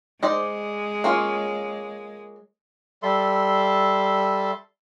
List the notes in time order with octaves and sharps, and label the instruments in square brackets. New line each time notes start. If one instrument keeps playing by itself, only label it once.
[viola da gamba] G#3 [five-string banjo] D#4 C5 D5
[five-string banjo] A#3 C#4 F4
[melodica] G3 A4 E5 C6